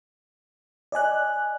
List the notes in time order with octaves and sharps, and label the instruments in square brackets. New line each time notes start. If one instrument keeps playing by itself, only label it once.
[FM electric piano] D5 D#5 G#5 F#6